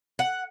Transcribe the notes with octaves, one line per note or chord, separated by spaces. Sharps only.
F#5